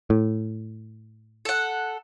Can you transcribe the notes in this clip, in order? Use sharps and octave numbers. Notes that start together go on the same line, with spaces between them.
A2
A4 F#5